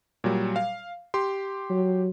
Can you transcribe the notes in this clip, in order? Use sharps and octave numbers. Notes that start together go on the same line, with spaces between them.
A#2 F#3 G3
F5
G4 C6
F#3